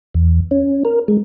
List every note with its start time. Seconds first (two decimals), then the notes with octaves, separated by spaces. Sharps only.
0.14 E2
0.51 C#4
0.85 A#4
1.08 G#3